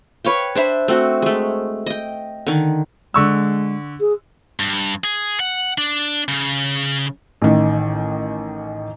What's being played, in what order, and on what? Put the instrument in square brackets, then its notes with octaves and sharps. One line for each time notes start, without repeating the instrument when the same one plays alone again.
[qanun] B4 C#5 F5 G5
D4 C5 E5 B5
A3 C4 F#4
G#3 A3
D#5 G5
D3 D#3
[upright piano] D3 C#6 E6 [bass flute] G#3
[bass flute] G#4
[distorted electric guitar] G2
G#4
F#5
D4
C#3
[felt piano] A1 D#3